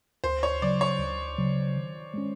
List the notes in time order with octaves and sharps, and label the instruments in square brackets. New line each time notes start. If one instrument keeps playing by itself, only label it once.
[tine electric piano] D2 [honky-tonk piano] C5
[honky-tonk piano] C#5
[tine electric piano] C#3 F#3 [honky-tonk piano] D5
[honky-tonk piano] C#5
[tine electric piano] D2
C#3 F#3
D#3
G#3 C#4